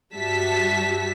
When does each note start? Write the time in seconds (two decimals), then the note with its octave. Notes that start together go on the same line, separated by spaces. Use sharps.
0.15 G2 G3 F#4 E5 A5 B6